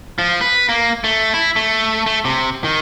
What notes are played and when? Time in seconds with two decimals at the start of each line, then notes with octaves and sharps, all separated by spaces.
0.19 F3
0.41 B4
0.69 A#3
1.04 A3
1.34 E4
1.56 A3
2.06 A3
2.25 C3
2.64 D#3